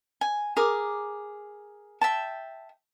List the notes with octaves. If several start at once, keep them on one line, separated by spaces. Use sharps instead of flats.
G#5
G#4 A#4 D6
E5 G5 A5